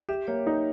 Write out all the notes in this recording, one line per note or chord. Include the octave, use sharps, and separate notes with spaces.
G4 E5
A#3 C#5 E5
D#4